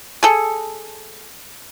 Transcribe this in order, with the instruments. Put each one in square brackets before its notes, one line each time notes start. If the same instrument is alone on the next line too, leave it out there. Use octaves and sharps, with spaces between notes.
[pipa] G#4 A4